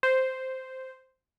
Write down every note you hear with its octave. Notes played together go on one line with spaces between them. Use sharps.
C5